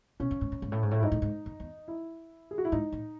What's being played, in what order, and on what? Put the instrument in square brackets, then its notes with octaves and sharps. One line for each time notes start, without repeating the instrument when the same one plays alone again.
[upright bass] B2 [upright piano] C#4
[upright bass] F#2
G#2
A2
G#2
A2
G#2
A2
[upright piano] E4
[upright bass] G#2 [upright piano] D#4
[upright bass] A2
G#2
F#2
E2
[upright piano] E4
G#4
F#4
E4
[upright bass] G#2 [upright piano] D#4
[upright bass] A2